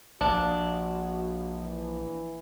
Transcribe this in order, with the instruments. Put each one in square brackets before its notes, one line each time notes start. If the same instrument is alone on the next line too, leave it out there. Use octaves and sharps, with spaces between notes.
[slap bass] A#1 [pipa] D4 [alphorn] F#4
[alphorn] E3